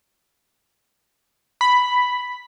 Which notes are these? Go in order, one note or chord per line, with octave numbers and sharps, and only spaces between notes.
B5